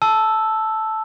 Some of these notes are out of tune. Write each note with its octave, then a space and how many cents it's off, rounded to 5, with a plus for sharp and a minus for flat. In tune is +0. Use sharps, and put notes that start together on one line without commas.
A5 -5 E6 +0